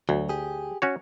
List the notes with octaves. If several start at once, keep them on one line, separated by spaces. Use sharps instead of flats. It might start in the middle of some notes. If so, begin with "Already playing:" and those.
D2 F#3
G4 G#4
C#4 F#4 C#5